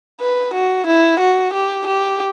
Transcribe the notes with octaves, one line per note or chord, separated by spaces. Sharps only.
B4
F#4
E4
F#4
G4
G4